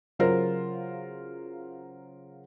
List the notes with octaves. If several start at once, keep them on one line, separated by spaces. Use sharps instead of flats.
C#3 F#3 F4 A#4 C5